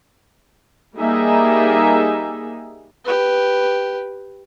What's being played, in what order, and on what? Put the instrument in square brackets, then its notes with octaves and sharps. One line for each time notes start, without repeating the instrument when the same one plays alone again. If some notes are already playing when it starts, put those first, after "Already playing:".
[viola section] G3 A#3 D#4 G#4 E5
[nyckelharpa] G4 B4